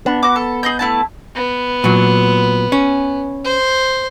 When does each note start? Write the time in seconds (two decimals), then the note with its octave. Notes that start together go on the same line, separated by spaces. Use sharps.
0.06 B3 D4
0.23 F#4 D6
0.36 A4
0.63 G#4 D#5 G6
0.79 A3 E4 A5
1.35 B3
1.84 A#2 F#3
2.72 C#4
3.44 C5